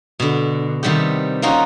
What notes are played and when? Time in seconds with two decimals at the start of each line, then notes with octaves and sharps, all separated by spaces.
0.20 B2 D3
0.83 C3 D#3 G3 B3 G4
1.42 A#3 C4 C#4 D#4 F4 F#4